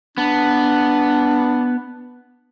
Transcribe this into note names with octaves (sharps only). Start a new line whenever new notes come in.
B3 D4